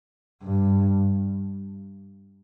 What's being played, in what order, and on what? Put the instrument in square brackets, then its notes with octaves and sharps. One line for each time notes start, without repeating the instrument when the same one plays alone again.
[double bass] G2